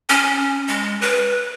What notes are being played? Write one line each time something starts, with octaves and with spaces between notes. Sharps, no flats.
C#4
G#3
B4